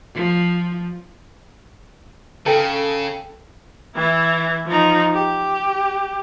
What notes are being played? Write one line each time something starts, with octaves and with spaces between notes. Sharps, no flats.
F3
C#3 A4 G5
E3 E4
F3 D#4
G4